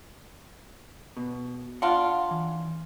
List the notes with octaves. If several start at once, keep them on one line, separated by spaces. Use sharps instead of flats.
B2
D4 F4 F#5
E3